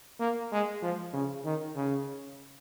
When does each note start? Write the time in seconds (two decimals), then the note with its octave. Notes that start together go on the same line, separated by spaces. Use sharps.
0.20 A#3
0.52 G#3
0.82 F3
1.13 C#3
1.45 D#3
1.76 C#3